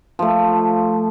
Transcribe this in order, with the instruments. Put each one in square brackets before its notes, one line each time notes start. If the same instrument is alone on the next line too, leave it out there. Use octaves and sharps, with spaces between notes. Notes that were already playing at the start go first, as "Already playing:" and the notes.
[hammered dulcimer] F3 A3